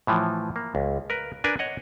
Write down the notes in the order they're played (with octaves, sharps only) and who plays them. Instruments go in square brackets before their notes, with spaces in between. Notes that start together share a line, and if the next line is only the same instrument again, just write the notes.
[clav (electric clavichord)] A2 E3 F3
A#3
C#2
A#4 B4
D4 A#4 B4 G#5
C#5 D#5 F#5